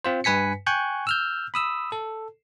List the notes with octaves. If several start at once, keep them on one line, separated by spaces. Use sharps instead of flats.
C4 F4 C5
G2 B4 G#5 B6 C#7
G5 G#5 C#6 F#6 G6
E6 F6 G6
B5 D#6 E6
A4